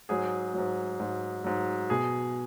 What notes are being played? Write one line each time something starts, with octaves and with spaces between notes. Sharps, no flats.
G#2 F#3 G#4
G#2 F#3
G#2 F#3
G#2 F#3
B2 G#4